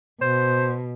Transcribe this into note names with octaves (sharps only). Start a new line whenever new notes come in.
B2 C5